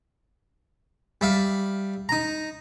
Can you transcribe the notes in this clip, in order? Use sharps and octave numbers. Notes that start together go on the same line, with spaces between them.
G3 E5 F5
D#4 A#5